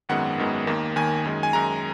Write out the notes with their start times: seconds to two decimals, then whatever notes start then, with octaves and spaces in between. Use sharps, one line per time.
0.09 G#1 F#2 D#3 G#3 B3 F#5
0.38 G#1 F#2 D#3 G#3 B3
0.67 D#2 D#3 A#3
0.96 D#2 D#3 A#3 G#5
1.25 F#2 D#3 G#3
1.43 G#5
1.53 F#2 D#3 G#3 A#5